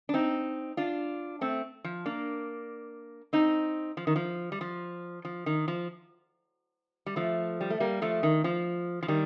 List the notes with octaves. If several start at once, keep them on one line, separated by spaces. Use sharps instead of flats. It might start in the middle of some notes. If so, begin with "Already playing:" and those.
D4
C4 D#4
D4 F4
A3 C4
F3
A#3 D4
C4 D#4
F3
D#3
F3
G3
F3
F3
D#3
F3
G3
F3 A3
G3
A3
G3 A#3
F3 A3
D#3
F3
F3
D#3 G3